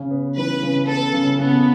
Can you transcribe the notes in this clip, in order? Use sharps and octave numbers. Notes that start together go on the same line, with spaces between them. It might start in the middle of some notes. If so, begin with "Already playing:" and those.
Already playing: C#3
B3
E3 B4
C#3
B3 A4
C#3
C#3 B3